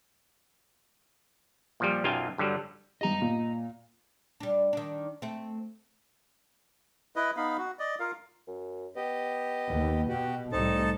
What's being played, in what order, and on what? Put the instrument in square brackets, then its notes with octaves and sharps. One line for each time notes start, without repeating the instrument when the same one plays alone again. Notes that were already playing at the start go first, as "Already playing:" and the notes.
[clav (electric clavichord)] A#2 F3 G3
B1 F#2 F4 F5 G5 G#5
G2 D3 F#3 G3
[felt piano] G2 G4 [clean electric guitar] D#5 A#5
[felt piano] A#2
[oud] G3 D4
D#3 D4
A3 C4
[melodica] E4 B4 D#5
B3 D#4 F5 B5
F#4
D5 D#5
F4 A#4 F5
[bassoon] F#2
[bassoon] B3 [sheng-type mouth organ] G4 D#5
[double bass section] D#2
[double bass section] B2 [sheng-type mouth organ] F#4 G4
[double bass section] C2 A2 G3 [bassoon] C4 [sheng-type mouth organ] D#4 A4 A5